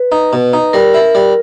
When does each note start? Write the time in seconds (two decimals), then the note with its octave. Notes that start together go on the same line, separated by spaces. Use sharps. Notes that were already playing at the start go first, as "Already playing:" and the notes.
Already playing: B4
0.12 D#4
0.33 B2
0.53 D#4
0.73 G3 A#4
0.94 E4
1.15 G3